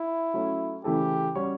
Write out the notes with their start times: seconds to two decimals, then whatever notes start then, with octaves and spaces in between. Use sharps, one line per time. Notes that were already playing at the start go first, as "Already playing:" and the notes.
Already playing: E4
0.34 F#3 A3 C#4
0.84 C#3 E3 A3 E4 G4 A4
1.35 G3 C#4 F#4 C#5